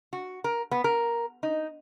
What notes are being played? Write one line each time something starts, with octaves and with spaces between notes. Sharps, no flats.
F#4
A#4
B3
A#4
D#4